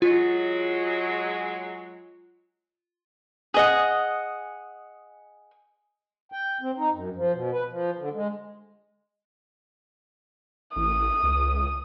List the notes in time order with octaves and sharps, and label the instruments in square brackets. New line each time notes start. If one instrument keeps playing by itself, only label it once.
[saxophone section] F#3 G#3 [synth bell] F4
[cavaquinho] G#4 D#5 F#5
[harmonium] G5
C4
D#4
F#2
F3
B2
B4
F3
D3
G#3
[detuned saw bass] A1 [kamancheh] D#6
[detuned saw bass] C#2